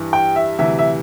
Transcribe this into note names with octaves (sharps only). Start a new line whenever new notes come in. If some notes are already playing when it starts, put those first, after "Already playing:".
Already playing: G2 E3 G3
G5
E5
D2 C3 E3 G3 E5
E5